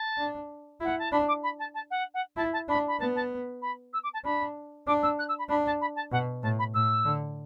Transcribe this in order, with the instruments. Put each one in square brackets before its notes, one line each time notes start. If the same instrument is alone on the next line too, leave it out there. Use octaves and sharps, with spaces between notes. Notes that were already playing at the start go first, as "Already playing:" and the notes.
Already playing: [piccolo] A5
[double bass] D4
[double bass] E4 [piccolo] F#5
[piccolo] A5
[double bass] D4 [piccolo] B5
[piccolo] D6
B5
A5
A5
F#5
F#5
[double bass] E4 [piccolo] A5
[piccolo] A5
[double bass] D4 [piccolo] B5
[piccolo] B5
[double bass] B3 [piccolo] A5
[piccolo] A5
B5
E6
D6
A5
[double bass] D4 [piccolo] B5
[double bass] D4 [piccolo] D6
[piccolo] E6
F#6
E6
B5
[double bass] D4 [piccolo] B5
[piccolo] A5
B5
A5
[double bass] B2 [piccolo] F#5
[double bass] A2 [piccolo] A5
[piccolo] B5
[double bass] A2 [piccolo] E6
[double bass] D3